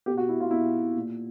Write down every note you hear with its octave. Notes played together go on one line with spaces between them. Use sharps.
B2 G4
F#4
E4
F4
B2 E4
A#2